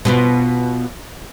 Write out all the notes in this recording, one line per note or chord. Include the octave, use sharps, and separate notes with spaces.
B2 B3 F4